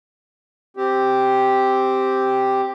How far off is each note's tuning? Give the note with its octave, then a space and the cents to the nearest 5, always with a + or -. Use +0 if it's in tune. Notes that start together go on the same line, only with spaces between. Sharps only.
C4 +0 G4 +0